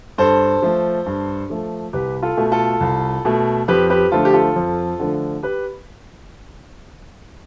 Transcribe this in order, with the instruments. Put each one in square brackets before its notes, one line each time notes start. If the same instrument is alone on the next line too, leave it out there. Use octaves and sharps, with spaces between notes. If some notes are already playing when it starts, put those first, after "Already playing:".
[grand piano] G2 A4 C5
F3 A3
G2
F3 A3
C2 G4 B4
F4 A4
B2 A3
F4 A4
C2
B2 A3
F2 G4 B4
G4 B4
D3 F3 A3 F4 A4
G4
F4 A4
F2
D3 F3 A3
G4 B4